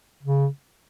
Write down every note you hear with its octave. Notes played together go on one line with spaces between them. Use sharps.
C#3